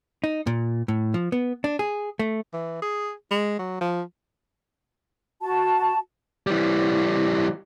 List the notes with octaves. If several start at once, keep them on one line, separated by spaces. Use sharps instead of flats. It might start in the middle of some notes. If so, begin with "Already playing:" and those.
D#4
A#2
A2
F3
B3
D4
G#4
A3
E3
G#4
G#3
F#3
F3
F#4 A5
E3 G3